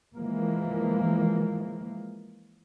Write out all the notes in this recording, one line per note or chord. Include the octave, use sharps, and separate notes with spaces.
E3 F3 G#3 A#3